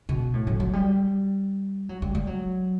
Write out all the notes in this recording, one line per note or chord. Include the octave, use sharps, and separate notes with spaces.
B2
A2
F#3
F#3
G3
F#3
G3
G3
F#3